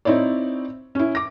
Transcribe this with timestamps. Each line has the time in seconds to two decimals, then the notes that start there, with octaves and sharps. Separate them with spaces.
0.05 C4 D#4 E4 C#5 D5
0.95 C#4 E4
1.15 D6 A#6